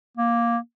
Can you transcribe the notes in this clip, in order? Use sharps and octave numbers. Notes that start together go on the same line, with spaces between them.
A#3